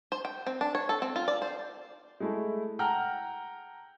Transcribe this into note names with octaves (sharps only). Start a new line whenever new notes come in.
C5
G5
C4
D4
C#5
A4
C4
F4
D5
C5
G#3 A3 E4
F#5 G5 A5 A#5 F6